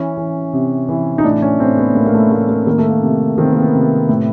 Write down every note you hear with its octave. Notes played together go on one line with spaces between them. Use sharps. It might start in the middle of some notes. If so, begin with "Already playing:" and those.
Already playing: E3 C#4
E3
C3
E3
D#4
A2 D4
C#4
A2 C4
B3
A2 A#3
A#3
A3
A2 A#3
A#3
D#3 A#3
A3
A#3
C3
D#3 C4
B3
A#3
B3
C3
A2